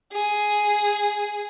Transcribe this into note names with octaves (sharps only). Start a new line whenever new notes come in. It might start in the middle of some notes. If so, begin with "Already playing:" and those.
G#4